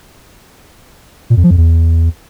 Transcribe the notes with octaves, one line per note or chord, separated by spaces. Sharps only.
A#2
F2
F3
F2
E2